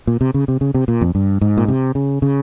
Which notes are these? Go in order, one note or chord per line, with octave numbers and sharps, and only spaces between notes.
A#2
C3
C#3
C3
C#3
C3
A#2
F2
G2
G#2
A#2
C3
C#3
C#3